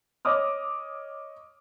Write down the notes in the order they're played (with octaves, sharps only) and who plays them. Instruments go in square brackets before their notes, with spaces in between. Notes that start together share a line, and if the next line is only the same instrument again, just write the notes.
[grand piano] C#5 D#5 D6 D#6 F6